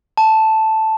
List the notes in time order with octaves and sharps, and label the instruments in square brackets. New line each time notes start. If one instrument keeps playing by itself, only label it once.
[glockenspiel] A5